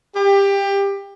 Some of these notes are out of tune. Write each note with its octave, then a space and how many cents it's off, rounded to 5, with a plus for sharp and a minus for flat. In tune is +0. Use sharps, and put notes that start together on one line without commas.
G4 +20